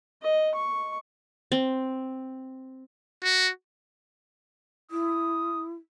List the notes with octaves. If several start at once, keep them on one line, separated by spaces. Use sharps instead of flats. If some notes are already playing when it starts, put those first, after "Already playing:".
D#5
C#6
C4
F#4
E4 D#6